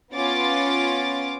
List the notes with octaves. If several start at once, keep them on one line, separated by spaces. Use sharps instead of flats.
B3 C#4 F4 C#5 D6 A6